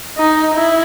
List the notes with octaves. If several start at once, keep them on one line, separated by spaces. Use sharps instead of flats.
D#4
E4